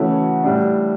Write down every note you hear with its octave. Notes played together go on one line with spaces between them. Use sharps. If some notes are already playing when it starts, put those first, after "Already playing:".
Already playing: C#3 E3 A3 C#4 F#4
A2 G3 D4